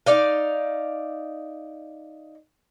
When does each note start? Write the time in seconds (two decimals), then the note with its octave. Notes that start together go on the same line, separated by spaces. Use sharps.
0.06 D#4 D5 F5